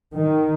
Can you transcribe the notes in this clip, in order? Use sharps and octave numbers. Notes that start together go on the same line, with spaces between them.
D#3